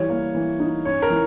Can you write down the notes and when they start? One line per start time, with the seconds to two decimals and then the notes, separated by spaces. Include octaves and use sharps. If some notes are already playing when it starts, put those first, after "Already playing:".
Already playing: E3 G3 C#5
0.09 A#3
0.35 E3
0.60 D#4
0.85 C#4 C#5
1.02 A#4
1.10 E3